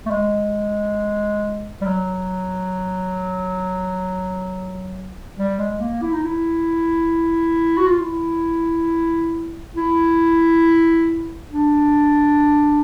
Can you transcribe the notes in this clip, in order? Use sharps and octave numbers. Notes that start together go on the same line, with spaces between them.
A3
G#3
G3
F#3
G3
G#3
A#3
E4
D#4
E4
F#4
F4
E4
E4
D4